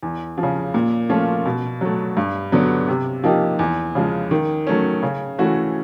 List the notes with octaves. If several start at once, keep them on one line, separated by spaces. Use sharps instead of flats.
E2
F3
C#3
A#2
F3 A3 C#4 F4
B2
F#3 A3
G2
D3 F#3 B3
C3
F3 A#3 D#4 G4
E2
C#3 F3 G#3
D#3
F#3 A3 C#4
C#3
E3 A3 C#4 F#4